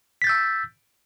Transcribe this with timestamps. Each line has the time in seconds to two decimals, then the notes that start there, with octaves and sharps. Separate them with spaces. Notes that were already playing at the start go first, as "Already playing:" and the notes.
0.22 B6
0.24 A6
0.27 G6
0.29 E6